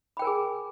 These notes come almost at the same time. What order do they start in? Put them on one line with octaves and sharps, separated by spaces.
B5 G5 A#4 G#5 G#4